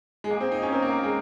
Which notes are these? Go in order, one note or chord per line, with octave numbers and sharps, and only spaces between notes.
G#3
A#3 G#4
C4
D#4
C#4
C4 A#4
A#3
A#3
G#3